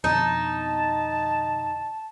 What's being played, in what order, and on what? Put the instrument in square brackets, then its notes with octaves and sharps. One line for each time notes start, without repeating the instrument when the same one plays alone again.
[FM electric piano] F2 B2 D3 [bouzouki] D#4 [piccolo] A5